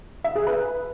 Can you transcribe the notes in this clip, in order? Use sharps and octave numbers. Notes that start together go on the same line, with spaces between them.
E5
G#4
B4